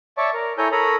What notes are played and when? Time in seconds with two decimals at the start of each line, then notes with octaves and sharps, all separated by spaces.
0.18 C#5 D5 E5 A5 C#6
0.34 A#4
0.58 E4 A4 C#5 G#5 A#5 G6
0.72 A4 A#4 C#5 A#5 B5 D#6